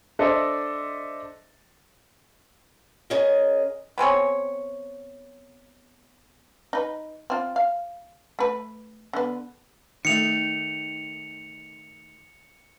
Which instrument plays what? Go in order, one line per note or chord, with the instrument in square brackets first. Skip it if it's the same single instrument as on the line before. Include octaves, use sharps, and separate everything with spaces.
[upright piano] D4 A4 C5 D#5 E5
[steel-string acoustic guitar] C#4 G#4 A#4 D#5 G#5
[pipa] B3 C4 G#4 C#5
[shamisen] D#4 B4
C4 F4
F5
A3 B4
D3 B3
[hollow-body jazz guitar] D#3 A3 [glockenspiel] C#7 F7